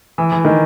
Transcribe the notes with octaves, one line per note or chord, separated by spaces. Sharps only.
E3
E3
D#3